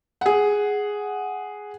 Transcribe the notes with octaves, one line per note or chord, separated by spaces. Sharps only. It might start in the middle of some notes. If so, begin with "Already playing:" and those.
G#4 F#5